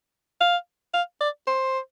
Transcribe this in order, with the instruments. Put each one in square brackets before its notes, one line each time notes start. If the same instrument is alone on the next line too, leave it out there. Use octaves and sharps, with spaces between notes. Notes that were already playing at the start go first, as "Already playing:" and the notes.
[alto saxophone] F5
F5
D5
C5